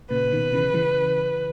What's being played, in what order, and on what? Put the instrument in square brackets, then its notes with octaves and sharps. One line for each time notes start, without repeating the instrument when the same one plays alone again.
[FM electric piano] A#2 C#3 [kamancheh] B4
[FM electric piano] B2 D#3
C#3 E3
C#3 E3